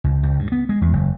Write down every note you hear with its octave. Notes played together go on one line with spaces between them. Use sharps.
C#2
C#2
G2
B3
G#3
E2
F#1